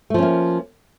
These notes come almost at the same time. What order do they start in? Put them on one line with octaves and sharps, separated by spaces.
A3 F3 C#4 A#3